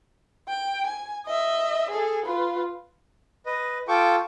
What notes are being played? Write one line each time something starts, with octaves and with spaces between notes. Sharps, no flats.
G5
G#5
D#5 E5
G#4 A4
F4 B4
B4 D#5
F4 A4 G5 C#6 D6